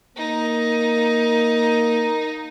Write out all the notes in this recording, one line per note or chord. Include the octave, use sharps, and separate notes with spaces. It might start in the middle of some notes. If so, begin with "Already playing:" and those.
A#3 D#4